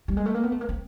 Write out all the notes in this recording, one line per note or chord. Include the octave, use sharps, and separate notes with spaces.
G3
G#3
A3
A#3
B3
A3
A#3
C4